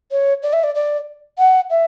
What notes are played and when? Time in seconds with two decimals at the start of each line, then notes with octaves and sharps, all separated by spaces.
0.11 C#5
0.43 D5
0.53 E5
0.64 D5
0.75 D5
1.38 F#5
1.70 E5